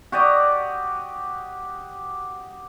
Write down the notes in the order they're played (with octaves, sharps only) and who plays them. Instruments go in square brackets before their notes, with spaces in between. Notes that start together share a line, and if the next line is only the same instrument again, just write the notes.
[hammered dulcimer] F#4 G4 D5 D#5